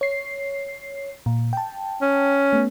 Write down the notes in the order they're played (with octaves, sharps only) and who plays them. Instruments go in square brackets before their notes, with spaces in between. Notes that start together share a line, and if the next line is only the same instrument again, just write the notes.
[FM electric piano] C#5 C7
A#2
G5 A5
[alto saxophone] C#4
[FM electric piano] A3 B3